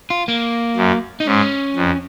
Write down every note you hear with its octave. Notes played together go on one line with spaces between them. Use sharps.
F4
A#3
F#2
D#4
G#2 C#4
F2